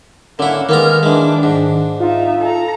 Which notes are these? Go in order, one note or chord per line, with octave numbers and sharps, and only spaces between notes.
D3 A#3 C#4 E4 F#5
D#3 G#3 A#3 B3 A#5 F6
E3 G#3 D4
G#2
D#4 F4 E5
A4 A#5